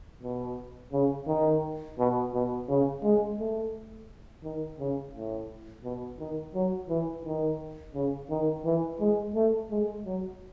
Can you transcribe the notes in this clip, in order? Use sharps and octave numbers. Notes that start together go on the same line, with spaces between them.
B2
C#3
D#3
B2
B2
C#3
G#3
A3
D#3
C#3
A2
B2
D#3
F#3
E3
D#3
C#3
D#3
E3
G#3
A3
G#3
F#3